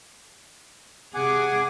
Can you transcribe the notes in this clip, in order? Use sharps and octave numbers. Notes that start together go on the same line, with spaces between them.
C3 G#4 F#5 G#5 D6